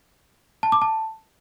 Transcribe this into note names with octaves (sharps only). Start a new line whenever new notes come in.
A5
D6
A5